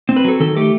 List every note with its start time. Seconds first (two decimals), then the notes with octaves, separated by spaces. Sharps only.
0.09 C4
0.16 B4
0.24 F#3 A4
0.40 D#3 A4
0.57 A3 G4